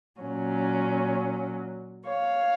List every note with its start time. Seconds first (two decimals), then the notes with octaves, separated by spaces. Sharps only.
0.21 A#2 F#3 C#4
2.08 C#5 F5